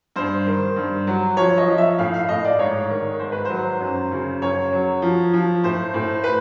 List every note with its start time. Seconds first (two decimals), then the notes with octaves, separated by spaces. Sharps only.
0.16 G2 C5
0.47 D#3
0.76 G2
1.07 F#3
1.37 F3 C#5
1.58 D#5
1.68 F3
1.78 E5
1.98 A2 F5
2.14 F5
2.29 A2 D#5
2.45 D5
2.59 G#2 C#5
2.90 D#3
3.19 G#2 C5
3.32 B4
3.45 C5
3.50 F#3
3.80 F#2
4.11 C#3
4.42 F#2 C#5
4.72 F#3
5.02 F3
5.34 F3
5.63 A2 C5
5.94 A2
6.24 B4